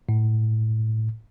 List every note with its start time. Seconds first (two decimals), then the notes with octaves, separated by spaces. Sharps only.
0.09 A2